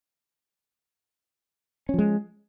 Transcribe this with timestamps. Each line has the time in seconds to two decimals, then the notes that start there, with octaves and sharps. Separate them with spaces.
1.89 C#4
1.94 F3
1.99 G#3